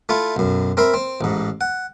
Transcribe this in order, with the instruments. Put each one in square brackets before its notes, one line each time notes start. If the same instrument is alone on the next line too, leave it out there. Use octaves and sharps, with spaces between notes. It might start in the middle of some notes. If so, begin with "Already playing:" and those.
[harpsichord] A3 E4 F4
B1 F#2
C4 A#4 E5 B5
C4
A1 G#2
F#5